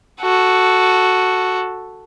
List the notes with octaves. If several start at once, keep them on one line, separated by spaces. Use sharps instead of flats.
F#4 A4